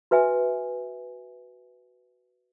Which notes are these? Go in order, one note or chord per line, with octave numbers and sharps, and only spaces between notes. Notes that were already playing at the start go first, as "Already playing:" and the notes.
F#4 B4 E5 G#5